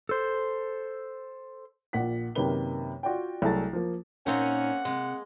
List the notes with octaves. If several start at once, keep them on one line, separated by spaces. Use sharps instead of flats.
A4 C5
A#1 A#2 F#5 B6
F#2 C3 D#3 A#3 B4 G7
F4 F#4 D5 G5
C2 F#3 A3 G#4 A5 A6
F3 A#3
A#2 A#3 C4 C#4 D#4 F#5 A#5
C3 G#3